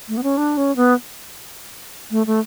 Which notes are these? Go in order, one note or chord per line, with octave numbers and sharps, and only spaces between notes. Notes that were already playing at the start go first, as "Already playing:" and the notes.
A3
B3
C#4
D4
C#4
B3
A3
A3